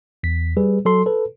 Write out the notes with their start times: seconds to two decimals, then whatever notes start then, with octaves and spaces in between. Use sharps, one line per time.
0.23 E2 B6
0.57 G3 G#4 B4
0.85 F#3 A4 C6
1.06 A4 B4